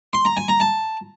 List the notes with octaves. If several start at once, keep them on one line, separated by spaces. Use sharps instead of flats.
C6
A#5
G#5
A#5
A5